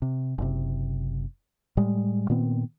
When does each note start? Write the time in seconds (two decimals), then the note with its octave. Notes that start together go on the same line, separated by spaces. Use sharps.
0.02 C3
0.38 F#1 C3
1.77 A2 G3 G#3
2.30 A#2 D#3 B3 C4